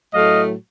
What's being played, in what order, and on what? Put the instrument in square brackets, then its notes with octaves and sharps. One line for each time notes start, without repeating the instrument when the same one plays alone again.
[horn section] A2 F#3 A3 D#5 F5